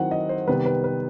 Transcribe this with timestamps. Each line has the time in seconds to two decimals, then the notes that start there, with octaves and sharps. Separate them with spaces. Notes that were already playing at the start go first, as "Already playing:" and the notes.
Already playing: D#3 F#3 C4 E4 F#5
0.11 D#5
0.29 C5
0.48 C3 D#3 G3 B3 B4
0.66 B4
0.84 B4